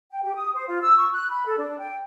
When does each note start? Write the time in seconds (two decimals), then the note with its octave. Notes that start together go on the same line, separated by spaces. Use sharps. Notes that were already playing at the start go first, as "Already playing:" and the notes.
0.11 G5
0.23 G4
0.35 D#6
0.54 C5
0.67 F4
0.81 E6
0.97 C#6
1.12 F#6
1.30 B5
1.46 A4
1.58 D4
1.79 G5